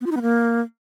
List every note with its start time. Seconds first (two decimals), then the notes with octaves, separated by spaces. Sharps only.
0.01 B3
0.06 F4
0.11 D#4
0.17 B3
0.22 A#3